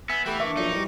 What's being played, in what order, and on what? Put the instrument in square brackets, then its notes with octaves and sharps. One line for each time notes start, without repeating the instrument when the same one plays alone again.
[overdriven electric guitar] B3 [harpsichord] E5 [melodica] G#5 [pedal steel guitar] E6
[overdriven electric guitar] E3 [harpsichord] A3 G4 [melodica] B3 E5 G5
[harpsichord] A#3 [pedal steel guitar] D4 E5 [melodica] C#6 D6
[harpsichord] B1 F2 A#2 [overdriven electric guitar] D#4
[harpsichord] E3 G3 [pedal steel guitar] F#4